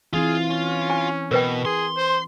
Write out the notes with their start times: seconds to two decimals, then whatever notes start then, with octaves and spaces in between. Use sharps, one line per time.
0.13 E3 C4 E4 F4 G#4
0.50 C#4
0.90 G#5
1.31 B2 A#4 B4 G5
1.65 G#4 C6
1.97 C5